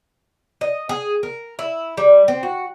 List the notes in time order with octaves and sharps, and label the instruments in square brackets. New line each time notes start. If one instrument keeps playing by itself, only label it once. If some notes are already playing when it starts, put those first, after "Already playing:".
[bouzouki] D#5
G#4
A#4
E4
G3
C4
F#4